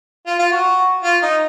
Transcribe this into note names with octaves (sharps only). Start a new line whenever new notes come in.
F4
F4
F#4
F4
D#4